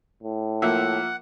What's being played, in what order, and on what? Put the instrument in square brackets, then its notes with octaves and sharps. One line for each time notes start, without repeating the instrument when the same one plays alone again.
[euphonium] A2
[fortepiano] F3 A#3 E5 [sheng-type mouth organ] F#5